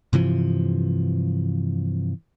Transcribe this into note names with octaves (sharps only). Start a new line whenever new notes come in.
G2 C3 E3 F3